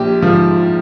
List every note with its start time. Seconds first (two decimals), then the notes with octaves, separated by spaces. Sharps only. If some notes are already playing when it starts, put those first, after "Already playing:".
Already playing: A#1 G4
0.22 G#2 F3